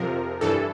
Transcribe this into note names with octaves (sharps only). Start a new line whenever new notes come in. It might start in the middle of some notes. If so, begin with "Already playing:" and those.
Already playing: F2 C3 F3 A#4
G2 E3 A4